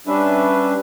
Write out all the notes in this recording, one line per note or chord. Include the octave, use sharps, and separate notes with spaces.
G3 C#4 D4 B4 E5